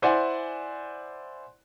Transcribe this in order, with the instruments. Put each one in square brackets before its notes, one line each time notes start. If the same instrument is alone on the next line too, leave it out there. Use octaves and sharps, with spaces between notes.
[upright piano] E4 C5 D5 F#5 G#5